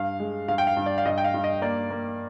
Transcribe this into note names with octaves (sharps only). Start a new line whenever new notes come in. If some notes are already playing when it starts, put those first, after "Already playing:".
Already playing: G2 F5
G#3
G2 F5
G5
F5
G2
D5
F5
G2 D#5
G5
F5
G2
D#5
A#3 D5
A#3